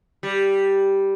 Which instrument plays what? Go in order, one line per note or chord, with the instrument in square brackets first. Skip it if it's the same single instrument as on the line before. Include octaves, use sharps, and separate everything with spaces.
[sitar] G3